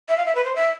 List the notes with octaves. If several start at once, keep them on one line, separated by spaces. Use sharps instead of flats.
E5
F5
E5
B4
C5
E5